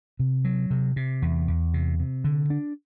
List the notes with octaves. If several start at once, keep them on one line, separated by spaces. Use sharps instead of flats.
C3
F#3
C3
C3
E2
E2
C3
C3
D3
D4